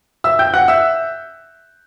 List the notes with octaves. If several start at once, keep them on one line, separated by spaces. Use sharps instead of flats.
E5 E6
G5 G6
F#5 F#6
E5 E6